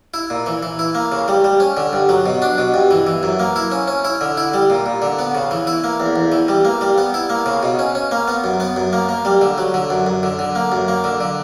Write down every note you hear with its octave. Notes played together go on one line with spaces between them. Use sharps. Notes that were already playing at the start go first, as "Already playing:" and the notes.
E4
A#2
E3
E3
E4
A#3
C#3
G3
G3
C#4
D3
G2
F#3
B2
D4
B2
G2
E3
E3
F#2
A#3
E4
C#4
C#4
E4
D3
E4
G3
A#2
A#2
D3
B3
C#3
E3
E4
A#3
E2
E2
E3
G3
A#3
G3
B3
E4
A#3
C#3
B2
C#4
C#4
A#3
B3
F#2
B3
F#2
A#3
A#3
G3
D3
F#3
D3
F#2
F#2
D3
D3
A#3
F#2
A#3
D3
D3